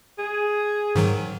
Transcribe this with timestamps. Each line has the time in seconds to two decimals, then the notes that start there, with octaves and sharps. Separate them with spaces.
0.19 G#4
0.95 G#2 D#3 F#3